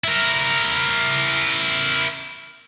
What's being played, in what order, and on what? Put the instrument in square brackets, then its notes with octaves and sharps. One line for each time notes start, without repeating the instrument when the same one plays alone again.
[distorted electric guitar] E4 A#4